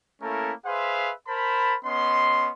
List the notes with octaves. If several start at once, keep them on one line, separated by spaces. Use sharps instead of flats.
A3 A#3 C#4 E4 A4 A#4
G#4 B4 C5 E5 F5 C6
A#4 C5 A5 B5
B3 C#4 D#5 C6